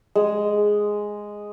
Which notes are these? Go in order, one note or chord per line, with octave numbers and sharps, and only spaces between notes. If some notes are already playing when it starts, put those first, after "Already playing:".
G#3